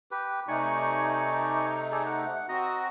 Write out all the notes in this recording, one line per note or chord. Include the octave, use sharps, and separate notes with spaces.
G4 B4
C3 A3 D#4 D5 G#5 C#6
G#4 A4 D5
F#5
C4 F#4 D#5 A#5